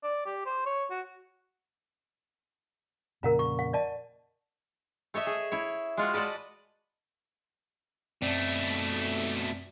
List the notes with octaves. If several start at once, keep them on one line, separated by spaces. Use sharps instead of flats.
D5
G4
C5
C#5
F#4
F2 A#2 C#3 A#4 F#5 A#5
C#6
F#5
D5 D#5 A5
A3 C#5 D#5 E5
G#4
E4 C#5
G#3 F4 F#4
B4 D5 D#5 F#5 A5
F#2 B2 A3 C4 D5